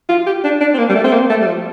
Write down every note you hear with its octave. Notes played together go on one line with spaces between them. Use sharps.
F4
G4
D4
D4
C4
A#3
G3
A3
C4
A#3
A3
G3
F3